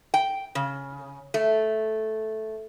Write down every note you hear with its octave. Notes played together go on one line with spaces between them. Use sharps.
G5
C#3
A3